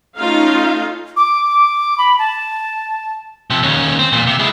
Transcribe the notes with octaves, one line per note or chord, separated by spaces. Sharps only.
A3 C#4 D#4 F4 F5
D6
B5
A5
C3 F3
D#2 C#4
C4
E2 A#2
C3
G#3 E4